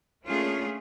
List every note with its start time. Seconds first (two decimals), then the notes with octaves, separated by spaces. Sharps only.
0.25 A3 A#3 C#4 D4 F4 G#4